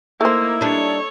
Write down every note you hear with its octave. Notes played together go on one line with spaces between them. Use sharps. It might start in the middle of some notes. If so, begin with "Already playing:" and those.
A3 A#3 D#4 E4 C5
G3 D4 A4 C#5